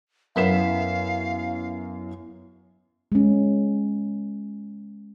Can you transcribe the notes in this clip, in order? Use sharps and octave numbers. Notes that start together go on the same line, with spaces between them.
F#2 B3 E4 F5 B6 E7
G#3 C#4